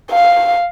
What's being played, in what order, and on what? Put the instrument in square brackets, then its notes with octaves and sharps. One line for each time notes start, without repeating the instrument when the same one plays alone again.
[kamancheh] F5